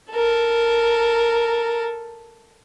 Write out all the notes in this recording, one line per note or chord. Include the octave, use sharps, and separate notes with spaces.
A4 A#4